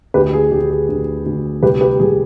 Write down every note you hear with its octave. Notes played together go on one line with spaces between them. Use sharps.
D2 G4 B4
G#4
D2 G4
G#4
D2
D2
C2 G4 B4
G4 B4
C2 G#4